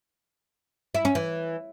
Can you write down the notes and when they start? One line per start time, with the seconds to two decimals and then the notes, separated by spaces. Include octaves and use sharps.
0.95 E4
1.05 C#4
1.15 E3